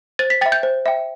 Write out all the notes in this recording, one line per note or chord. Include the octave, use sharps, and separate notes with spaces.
C5 A6
B6
E5 G5 A6
G6
C5
E5 G5